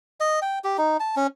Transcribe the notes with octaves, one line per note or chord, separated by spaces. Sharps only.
D#5
G5
G4
D#4
A5
C#4